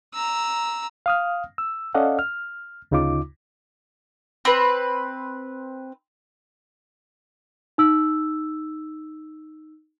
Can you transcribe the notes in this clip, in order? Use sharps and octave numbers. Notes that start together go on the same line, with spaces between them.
A#5 E6
F5 D#6 F6
E6
C#4 A4 D5 D#5 F5 F#5
F6
D2 C#3 D#4 F4 D6
C4 B4
D#4 E6